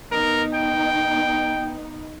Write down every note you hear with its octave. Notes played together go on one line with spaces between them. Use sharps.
B3 D#4 A#4
G5